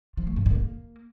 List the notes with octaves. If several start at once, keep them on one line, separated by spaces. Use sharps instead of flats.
F3
A3
G#2
G2
A#3